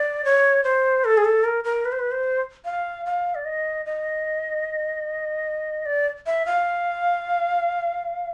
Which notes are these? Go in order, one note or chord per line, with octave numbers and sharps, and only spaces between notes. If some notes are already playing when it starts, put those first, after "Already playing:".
Already playing: D5
C#5
C5
A4
G#4
A4
A#4
A#4
B4
C5
B4
C5
F5
F5
D5
D#5
D#5
D5
E5
F5